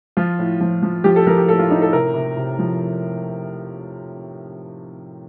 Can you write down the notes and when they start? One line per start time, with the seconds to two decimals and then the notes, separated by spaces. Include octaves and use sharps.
0.17 F3 F4
0.39 A2
0.61 F3
0.83 F3
1.04 F3 G4
1.16 A4
1.27 F3 A#4
1.38 G4
1.48 A2 A4
1.59 F4
1.70 A2 D#4
1.82 A4
1.93 C3 A#4
2.14 C3
2.37 C3
2.59 F3